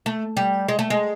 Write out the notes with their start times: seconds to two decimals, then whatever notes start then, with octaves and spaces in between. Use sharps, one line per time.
0.06 A3
0.37 G3
0.68 G#3
0.79 A3
0.90 G#3